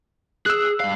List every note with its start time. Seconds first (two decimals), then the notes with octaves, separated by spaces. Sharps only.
0.46 G#4 E6 F#6
0.80 G2 F5